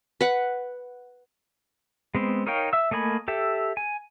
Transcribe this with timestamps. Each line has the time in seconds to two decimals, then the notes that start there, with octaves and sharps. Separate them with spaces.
0.21 B4 F#5
2.15 G#3 B3 C4
2.47 D#4 A#4 C#5 F5 G5
2.73 E5 E6
2.91 A3 A#3 D#5 G#5 B5
3.28 G4 A4 E5
3.77 G#5